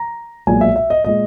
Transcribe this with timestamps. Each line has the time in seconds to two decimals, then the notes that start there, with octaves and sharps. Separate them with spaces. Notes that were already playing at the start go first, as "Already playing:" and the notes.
Already playing: A#5
0.47 B1 A#2 G#3 G#5
0.61 E5
0.76 E5
0.90 D#5
1.04 A#2 G#3 D#5